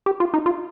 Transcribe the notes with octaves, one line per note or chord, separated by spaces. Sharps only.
G4
F4
D#4
F4